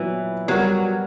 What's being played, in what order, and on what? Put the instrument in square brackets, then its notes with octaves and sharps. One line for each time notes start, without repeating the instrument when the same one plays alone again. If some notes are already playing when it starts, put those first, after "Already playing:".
Already playing: [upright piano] A#2 F#3 B3 [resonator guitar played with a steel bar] E3
[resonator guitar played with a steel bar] F#3 [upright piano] G3 B3 F#4 A#4